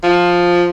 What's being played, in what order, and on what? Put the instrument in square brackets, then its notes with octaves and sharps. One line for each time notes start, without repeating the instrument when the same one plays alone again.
[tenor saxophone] F3